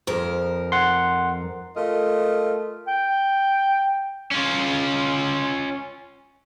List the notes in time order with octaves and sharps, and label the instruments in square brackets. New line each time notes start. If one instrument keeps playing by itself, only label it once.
[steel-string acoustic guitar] F2 F3 A#4
[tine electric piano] F#5 C6
[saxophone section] A3 F4 A#4 D#5
[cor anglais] G5
[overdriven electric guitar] C#4 F4